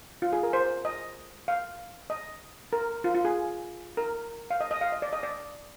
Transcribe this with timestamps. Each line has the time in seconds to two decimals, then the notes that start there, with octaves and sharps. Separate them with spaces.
0.22 F4
0.33 G#4
0.43 A#4
0.53 C5
0.85 D#5
1.48 F5
2.10 D#5
2.73 A#4
3.04 F4
3.15 F4
3.25 G#4
3.97 A#4
4.51 F5
4.61 D#5
4.71 D#5
4.81 F5
4.92 D#5
5.02 D5
5.13 D#5
5.23 D5